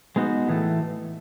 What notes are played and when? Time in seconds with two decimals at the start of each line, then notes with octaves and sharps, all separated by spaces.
0.16 G#3 B3 D#4 F#4
0.48 A2 E3 A3